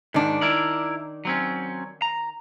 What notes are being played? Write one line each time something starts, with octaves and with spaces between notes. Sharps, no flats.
G#2 D#3 D4
E4 A#4 D5
F#3 C4 C#4
A#5